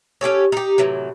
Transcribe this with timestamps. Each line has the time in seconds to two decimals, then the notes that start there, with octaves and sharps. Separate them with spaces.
0.21 C#4 G4 A4 C#5
0.52 D#4 G4
0.78 A2 C3 E3 F#3